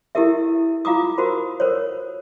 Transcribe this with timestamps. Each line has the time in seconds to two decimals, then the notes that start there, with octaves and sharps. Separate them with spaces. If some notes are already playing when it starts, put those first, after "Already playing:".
0.15 E4 G4 A4 A#4 E5
0.85 F4 F5 A#5 D6 D#6
1.18 F#4 A#4 C5 B5
1.60 A4 A#4 C5 C#5